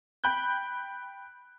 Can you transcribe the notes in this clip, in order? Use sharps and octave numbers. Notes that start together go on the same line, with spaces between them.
G5 B5 F#6 G6